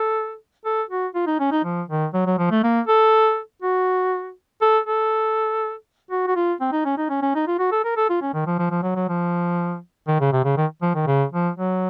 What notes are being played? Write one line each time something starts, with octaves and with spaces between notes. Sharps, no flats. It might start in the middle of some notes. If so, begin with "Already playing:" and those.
Already playing: A4
A4
F#4
F4
D#4
C#4
D#4
F3
D#3
F#3
F#3
F3
A3
A#3
A4
F#4
A4
A4
F#4
F#4
F4
C4
D#4
C#4
D#4
C#4
C#4
D#4
F4
F#4
A4
A#4
A4
F4
C#4
D#3
F3
F3
F3
F#3
F#3
F3
D#3
C#3
C3
C#3
D#3
F3
D#3
C#3
F3
F#3